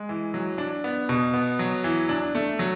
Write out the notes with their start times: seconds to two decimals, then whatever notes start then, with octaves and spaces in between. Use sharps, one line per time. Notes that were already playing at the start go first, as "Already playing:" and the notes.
Already playing: G#3
0.09 E3
0.34 F#3
0.58 D4
0.84 B3
1.09 B2
1.34 B3
1.59 F#3
1.84 E3
2.09 D4
2.35 A3
2.59 F#3